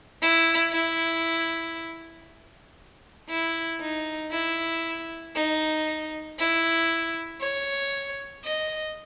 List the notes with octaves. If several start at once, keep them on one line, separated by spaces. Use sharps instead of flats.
E4
E4
E4
D#4
E4
D#4
E4
C#5
D#5